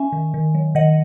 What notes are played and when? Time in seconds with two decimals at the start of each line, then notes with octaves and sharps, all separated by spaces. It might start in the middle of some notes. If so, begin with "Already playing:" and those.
Already playing: C#4 E5 G#5
0.12 D#3
0.34 D#3
0.54 F#3
0.75 D#3 D#5 F#5